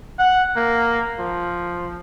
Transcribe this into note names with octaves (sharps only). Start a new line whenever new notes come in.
F#5
A#3
F3